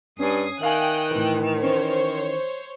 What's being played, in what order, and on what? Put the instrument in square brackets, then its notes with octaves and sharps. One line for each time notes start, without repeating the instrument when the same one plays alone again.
[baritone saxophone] G2 [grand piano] C#4 [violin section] G#5 D#6 C7
[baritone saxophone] D#3 [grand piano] E5 F5 G#5 [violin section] G5 D#6 F#6
[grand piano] A2 E3
[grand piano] E3 C#4 [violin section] C5 C#5